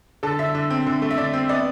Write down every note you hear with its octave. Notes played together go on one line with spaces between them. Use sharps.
D3 A4 A5
D3 E5
D3
C4
D3
A3
E5
D3 D5
C4
B3 D5